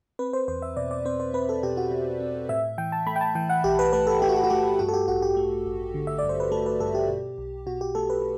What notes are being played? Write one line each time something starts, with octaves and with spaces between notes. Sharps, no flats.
C4 B4
C5
E2 C5
E5
B2 D5
D5
C4 C5
C5
C4 B4
A4
B2 G4
F#4
B2
C4
A2 E5
E3 G5
A5
A3 B5
G5
A5
E3 G5
F#5
B1 G4
B4
A3 B4
A4
A3 G4
F#4
G4
F#4
A3 G4
G2 F#4
A4
G4
A1 F#4
G4
A3
A1
D3
E5
G2 D5
C5
B4
A3 A4
B4
G2 A4
G4
B2
B1
B2 F#4
G4
A3 A4
B4